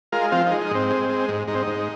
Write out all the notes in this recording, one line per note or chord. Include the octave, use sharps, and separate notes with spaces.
G#3 F4 A#4
F3 C4 F4
G#3 D#4
D#4
G#2 C4
G#3
G#3
G#2
G#2 D#4
C4
G#2 D#4